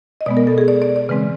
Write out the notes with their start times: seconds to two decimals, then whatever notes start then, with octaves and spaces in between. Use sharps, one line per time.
0.21 D#5
0.26 B2 G#3 B3 D5
0.37 A#4
0.47 A4
0.58 G#4
0.68 D5
0.82 D5
0.96 D5
1.09 C#3 E3 G#3 C4 B4